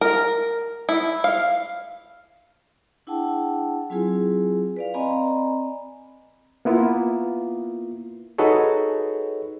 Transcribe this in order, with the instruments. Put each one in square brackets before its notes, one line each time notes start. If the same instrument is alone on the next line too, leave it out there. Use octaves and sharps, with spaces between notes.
[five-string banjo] A#4
E4
F5
[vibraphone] D4 E4 G#4 F#5 G5 A5
F#3 C4 E4 F4 G#4 G#5
B4 D5 F5
C4 D5 D#5 G#5 A#5 B5
[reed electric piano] A#3 B3 E4 F4
D#4 F#4 G#4 A4 B4 C#5